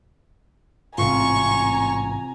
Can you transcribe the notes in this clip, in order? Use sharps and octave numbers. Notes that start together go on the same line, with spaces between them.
A1 G#2 C3 F4 G#5 A#5 C#6